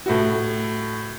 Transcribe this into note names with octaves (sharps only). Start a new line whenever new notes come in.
A2 E4 F#4